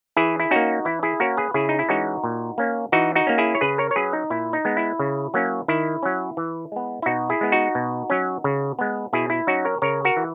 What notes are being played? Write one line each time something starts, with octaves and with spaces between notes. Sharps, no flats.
E3 E4 G#4
E4
A#3 C#4 D#4 F#4
E3 E4
E4 G#4
A#3 C#4 F#4 A#4
G#4 B4
C#3 E4 G#4
D#4
E4
E3 G#3 C#4 D#4 F#4
A#2
A#3 C#4
E3 D#4 F#4
D#4 F#4
A#3 C#4
E4 G#4
C#5
C#3 G#4 B4
A#4 C#5
C#5
F#3 C#4 G#4 B4
D#4
A#2 E4
D#4
G#3 B3
E4
C#3
F#3 A#3 C#4
D#3 E4
F#3 C#4
E3
G#3 B3
E4
B2 D#4 F#4
E4 G#4
G#3 B3
D#4 F#4
B2
F#3 C#4
C#3
G#3 B3
B2 E4 G#4
E4
F#3 C#4 D#4 F#4
A#4 C#5
C#3 A#4 C#5
F#4 A#4
E3